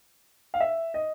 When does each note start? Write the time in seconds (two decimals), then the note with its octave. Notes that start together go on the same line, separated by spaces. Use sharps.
0.54 F5
0.60 E5
0.94 D#5